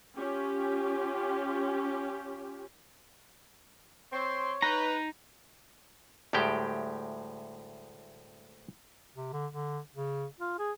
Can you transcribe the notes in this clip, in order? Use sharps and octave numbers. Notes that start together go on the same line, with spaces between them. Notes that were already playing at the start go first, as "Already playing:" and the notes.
C#4 F4 G4
C4 C#5 C6
D#4 B4 A#5
D2 A2 G3 G#3 G4 G5
C3
D3
D3
C#3
F4
G#4